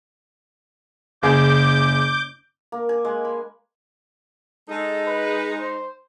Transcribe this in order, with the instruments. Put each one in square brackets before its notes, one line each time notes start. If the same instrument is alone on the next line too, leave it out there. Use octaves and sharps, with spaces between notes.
[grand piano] F#1 G#4 [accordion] D6 G6
[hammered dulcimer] A#3
G#5
G#3
B5
[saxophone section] G#3 D#4 [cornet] A4
[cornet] B4
C5